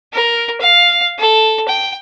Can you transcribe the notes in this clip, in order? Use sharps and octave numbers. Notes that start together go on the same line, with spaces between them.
A#4
F5
A4
G5